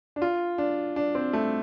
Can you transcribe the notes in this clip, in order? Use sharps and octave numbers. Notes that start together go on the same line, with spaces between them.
D4
F4
D4
D4
C4
A3